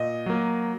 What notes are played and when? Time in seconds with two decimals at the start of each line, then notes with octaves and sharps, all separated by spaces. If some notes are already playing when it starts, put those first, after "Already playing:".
Already playing: A#2 D#5
0.26 F#3 A#3